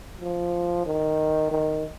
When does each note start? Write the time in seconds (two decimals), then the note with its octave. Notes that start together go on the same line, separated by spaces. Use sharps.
0.21 F3
0.86 D#3
1.51 D#3